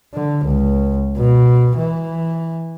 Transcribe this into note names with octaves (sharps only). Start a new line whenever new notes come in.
D3
C#2
B2
E3